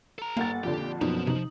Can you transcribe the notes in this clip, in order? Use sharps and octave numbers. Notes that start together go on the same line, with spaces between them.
A4 A#5
G1 A#3 F#5 A6
F2 A#2 D3 G4
F#2 B2 F3 D#4
C3 D#4 F#7